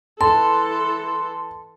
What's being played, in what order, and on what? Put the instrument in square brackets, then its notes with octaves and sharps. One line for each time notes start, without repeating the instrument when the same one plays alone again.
[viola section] E3 A4 [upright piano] A5 [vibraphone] C6